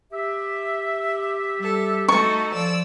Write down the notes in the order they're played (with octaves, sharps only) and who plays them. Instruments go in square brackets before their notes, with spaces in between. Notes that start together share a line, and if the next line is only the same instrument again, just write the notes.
[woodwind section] G4 E5
[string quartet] G3 A4
[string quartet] A3 D#4 F#4 [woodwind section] A4 [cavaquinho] C#6
[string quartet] F3 D5 E6